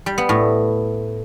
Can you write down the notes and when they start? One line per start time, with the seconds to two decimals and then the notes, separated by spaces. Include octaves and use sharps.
0.06 G3
0.18 B3
0.29 A2